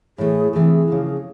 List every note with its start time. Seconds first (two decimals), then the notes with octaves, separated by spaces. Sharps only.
0.18 A2 E3 A3 G#4
0.53 C3 E3 A3 G#4
0.88 C#3 F3 A#3